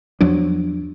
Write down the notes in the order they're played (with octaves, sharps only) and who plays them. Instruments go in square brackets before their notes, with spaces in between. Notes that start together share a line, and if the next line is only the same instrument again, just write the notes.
[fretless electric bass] E2 F3 F#3 D4